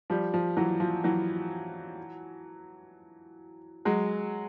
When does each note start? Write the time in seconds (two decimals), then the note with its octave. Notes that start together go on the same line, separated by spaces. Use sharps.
0.10 F3 G3
0.34 F3
0.57 E3 F#3
0.80 F3
1.04 E3 F#3
3.85 F#3 G#3